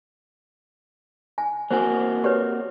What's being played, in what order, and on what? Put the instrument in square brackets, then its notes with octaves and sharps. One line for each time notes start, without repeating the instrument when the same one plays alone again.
[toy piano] G#5
[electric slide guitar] A#3 C4 F#4 [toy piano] C5 G#5
[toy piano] G4 B4 C#5